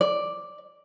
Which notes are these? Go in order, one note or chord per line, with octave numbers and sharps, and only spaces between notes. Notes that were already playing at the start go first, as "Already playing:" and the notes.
D5